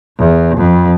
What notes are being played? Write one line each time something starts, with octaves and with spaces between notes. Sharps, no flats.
E2
F2